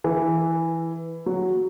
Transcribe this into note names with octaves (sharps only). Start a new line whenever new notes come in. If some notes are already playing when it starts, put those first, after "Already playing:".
E3
F#3